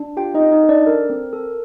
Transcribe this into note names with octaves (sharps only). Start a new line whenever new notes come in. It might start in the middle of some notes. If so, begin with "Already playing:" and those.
Already playing: D4
F4 G4 G5
D#4 D#5
C4
D#4 D#5
A4
D4 D5
A4 A#4
C4
A4